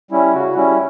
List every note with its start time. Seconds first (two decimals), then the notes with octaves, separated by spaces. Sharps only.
0.11 G3 C#4 E4
0.33 C#3 F#4
0.56 G3 C#4 E4